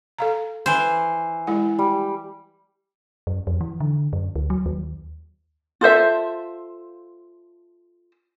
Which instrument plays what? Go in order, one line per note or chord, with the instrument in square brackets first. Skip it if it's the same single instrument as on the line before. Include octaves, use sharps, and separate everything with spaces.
[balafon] A4 F5 A#5
[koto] E3 C5
[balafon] G#3 E4 F#5
[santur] G3
[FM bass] F#2
F2
E3
D3
F#2
D2
F#3
D#2
[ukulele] F4 A4 C5 E5